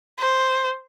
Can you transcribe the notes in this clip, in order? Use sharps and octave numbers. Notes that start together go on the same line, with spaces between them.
C5